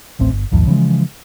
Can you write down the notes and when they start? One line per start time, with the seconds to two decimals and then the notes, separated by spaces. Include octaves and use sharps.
0.19 D1 A1 A3 C4
0.32 G1
0.51 A#1 D#2 G#2 F3
0.67 C#3 E3 F3 G#3